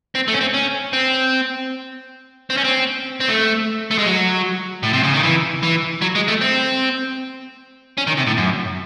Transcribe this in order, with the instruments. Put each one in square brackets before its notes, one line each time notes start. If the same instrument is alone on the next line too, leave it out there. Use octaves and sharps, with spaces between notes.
[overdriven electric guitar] C4
A3
C#4
C4
C#4
C4
C4
C#4
C4
C4
A3
A3
G#3
F#3
A2
C3
C#3
D#3
E3
E3
F#3
G#3
A3
C4
C#4
D#3
C3
A2
F#2